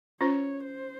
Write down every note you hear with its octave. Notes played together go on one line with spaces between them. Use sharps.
C#4 F4 C5 C#5
C5